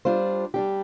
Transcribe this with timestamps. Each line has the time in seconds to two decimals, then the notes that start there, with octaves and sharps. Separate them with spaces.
0.05 G3 D4 F4 C5
0.54 G3 D4 G4